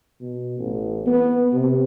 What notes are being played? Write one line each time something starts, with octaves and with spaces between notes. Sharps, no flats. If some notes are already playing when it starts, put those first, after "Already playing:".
B2
A1
B3
C3